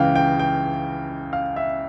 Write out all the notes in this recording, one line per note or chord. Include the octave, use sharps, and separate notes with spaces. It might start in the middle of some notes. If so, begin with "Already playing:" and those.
Already playing: C#2 C#3 E3 F5 G5
G5
G5
F5
E5